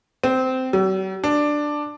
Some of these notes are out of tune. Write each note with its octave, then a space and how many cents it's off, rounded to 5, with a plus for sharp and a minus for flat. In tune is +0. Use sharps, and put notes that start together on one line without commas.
C4 -15
F#3 +45
D4 +5